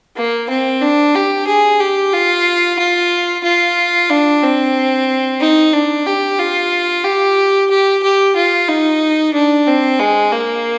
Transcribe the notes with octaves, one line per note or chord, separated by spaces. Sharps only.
A#3
C4
D4
G4
G#4
G4
F4
F4
F4
D4
C4
D#4
D4
G4
F4
G4
G4
G4
F4
D#4
D4
C4
G#3
A#3